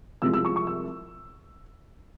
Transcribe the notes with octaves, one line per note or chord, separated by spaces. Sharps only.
C2 C3 F3 G#3 E6
E6
C#6
C#6
E6